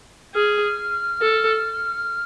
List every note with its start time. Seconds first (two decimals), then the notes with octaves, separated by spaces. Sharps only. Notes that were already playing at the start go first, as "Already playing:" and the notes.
0.35 G#4 F6
1.21 A4